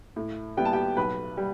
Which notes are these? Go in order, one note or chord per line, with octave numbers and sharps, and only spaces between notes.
A2
G3 B3 E4 G5
A5
G4 G5
B1 B4 B5
G3